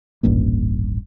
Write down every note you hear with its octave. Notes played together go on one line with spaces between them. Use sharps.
D#1 A1 G2 A#3